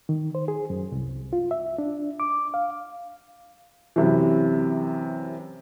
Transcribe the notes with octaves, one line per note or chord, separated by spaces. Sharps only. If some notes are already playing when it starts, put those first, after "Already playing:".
D#3
C5
G#4
F#2
C2
F4
E5
D4
D6
F5
F#2 C3 E3